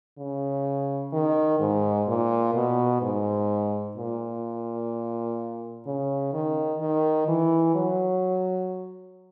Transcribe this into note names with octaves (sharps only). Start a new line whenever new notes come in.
C#3
D#3
G#2
A#2
B2
G#2
A#2
C#3
D#3
D#3
E3
F#3